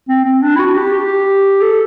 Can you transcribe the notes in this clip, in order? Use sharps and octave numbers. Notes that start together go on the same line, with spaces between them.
C4
C4
D4
E4
F#4
G4
G4
A4